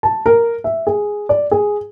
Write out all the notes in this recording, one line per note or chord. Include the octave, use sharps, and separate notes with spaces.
A5
A#4
E5
G#4
D5
G#4